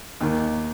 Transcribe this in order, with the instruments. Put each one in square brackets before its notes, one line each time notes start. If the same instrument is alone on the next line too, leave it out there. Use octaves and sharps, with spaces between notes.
[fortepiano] D#2 D#3 A#3